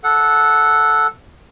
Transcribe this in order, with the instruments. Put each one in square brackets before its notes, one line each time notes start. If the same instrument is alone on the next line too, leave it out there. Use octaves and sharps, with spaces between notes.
[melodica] A4 F#5